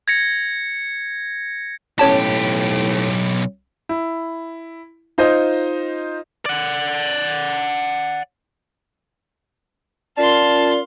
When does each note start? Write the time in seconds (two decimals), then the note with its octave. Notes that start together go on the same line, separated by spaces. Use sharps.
0.08 G#6 A#6 C#7
1.99 B1 A2 C#4 G4 C#5 A5
3.89 E4
5.18 D#4 F4 C5 D#5
6.46 D5 F#5
10.17 C#4 F4 A#4 D5 F5 A5 C6